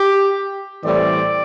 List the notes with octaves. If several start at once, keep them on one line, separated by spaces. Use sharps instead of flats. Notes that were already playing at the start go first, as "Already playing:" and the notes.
Already playing: G4
A2 E3 G3 C4 D5